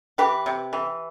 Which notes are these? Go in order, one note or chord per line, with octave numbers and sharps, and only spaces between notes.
E3 G4 B4
C3
E3